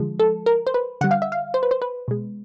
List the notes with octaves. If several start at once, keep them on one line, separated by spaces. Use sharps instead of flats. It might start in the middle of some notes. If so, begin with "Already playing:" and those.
Already playing: D3 F3 G#3
A4
A#4
C5
B4
D3 G3 F#5
F5
E5
F5
C5
B4
C5
B4
B2 G#3